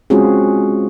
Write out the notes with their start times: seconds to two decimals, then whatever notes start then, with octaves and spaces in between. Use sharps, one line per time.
0.10 G#3 C4 C#4 F4 F#4 G#4